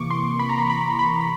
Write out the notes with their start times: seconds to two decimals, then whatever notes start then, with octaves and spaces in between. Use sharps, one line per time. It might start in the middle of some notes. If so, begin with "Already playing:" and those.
Already playing: C3 E3 A#3 C#6 D6
0.10 C6
0.39 B5
0.49 A#5
0.58 B5
0.70 B5
0.99 B5
1.20 B5